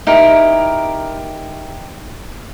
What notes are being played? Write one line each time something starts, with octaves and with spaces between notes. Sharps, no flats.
D#4 E4 G4 A#4